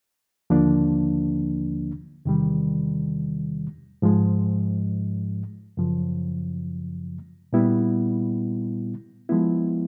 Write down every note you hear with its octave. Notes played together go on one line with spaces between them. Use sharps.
D#2 D3 F3 A#3 D4
E2 C3 D#3 G3
G#2 F3 G#3
F#2 C#3 F3
A#2 G3 B3 E4
F3 G#3 B3 E4